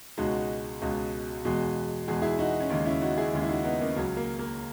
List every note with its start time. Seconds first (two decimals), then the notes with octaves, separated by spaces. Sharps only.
0.18 C#2 B2 G#3 D#4 F#4
0.82 C#2 B2 G#3
1.45 E2 B2 G#3
2.08 E2 B2 G#3 G#4
2.22 E4 G#4
2.39 D#4 F#4
2.60 C#4
2.70 D#2 C#3 G#3 D#4
2.85 C#4 E4
3.01 D#4 F#4
3.17 E4 G#4
3.33 D#2 C#3 G#3
3.42 E4
3.49 D#4 F#4
3.64 B3 D#4
3.81 A#3 C#4
3.96 C#2 C#3 F#3
4.17 A#3
4.39 A#3